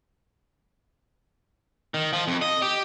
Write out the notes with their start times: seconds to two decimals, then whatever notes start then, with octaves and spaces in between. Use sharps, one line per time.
1.94 D#3
2.13 F3
2.27 F2
2.42 D#5
2.62 G4